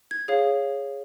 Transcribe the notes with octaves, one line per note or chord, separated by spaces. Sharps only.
G#6
G#4 C#5 F5